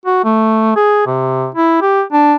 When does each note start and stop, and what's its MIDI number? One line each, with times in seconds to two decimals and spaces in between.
0.06 0.20 66
0.24 0.72 57
0.76 1.03 68
1.06 1.48 48
1.55 1.80 64
1.81 2.02 67
2.12 2.36 62